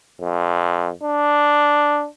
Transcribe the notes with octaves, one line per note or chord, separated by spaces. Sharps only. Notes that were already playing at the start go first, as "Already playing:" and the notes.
F2
D4